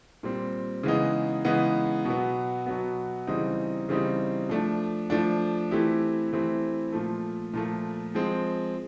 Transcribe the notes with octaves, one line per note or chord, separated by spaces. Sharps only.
A#2 G3 C4
C#3 E3 G#3 B3 D#4
C#3 E3 G#3 B3 D#4
B2 F#3 B3
B2 F#3 B3
C#3 E3 G3 C4 D#4
C#3 E3 G3 C4 D#4
F3 A3 D4
F3 A3 D4
E3 A3 C4 E4 G4
E3 A3 C4 E4 G4
A#2 F3 A3
A#2 F3 A3
F3 G#3 C4